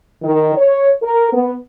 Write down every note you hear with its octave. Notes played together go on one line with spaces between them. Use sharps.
D#3
C#5
A#4
B3